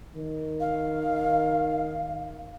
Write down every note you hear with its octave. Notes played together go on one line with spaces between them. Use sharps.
D#3
F5